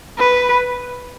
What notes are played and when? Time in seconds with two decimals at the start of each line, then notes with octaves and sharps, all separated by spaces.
0.19 B4